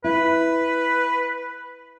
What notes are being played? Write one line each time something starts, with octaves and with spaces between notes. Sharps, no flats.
E4 B4